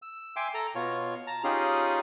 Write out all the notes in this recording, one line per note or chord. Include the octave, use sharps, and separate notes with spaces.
E6
E5 G5 G#5 C6 D6
A4 A#5
B2 F4 C#5
A5 A#5
C#4 D#4 F4 G4 G#4